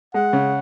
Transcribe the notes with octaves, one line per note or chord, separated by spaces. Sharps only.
G#3 F#5
C#3